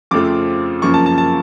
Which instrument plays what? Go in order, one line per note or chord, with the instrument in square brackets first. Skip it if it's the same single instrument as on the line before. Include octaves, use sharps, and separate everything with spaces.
[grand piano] F2 C#3 F3 A3 C4 D6
F#2 C#3 F3 A#3 C#6
A5
A5
A5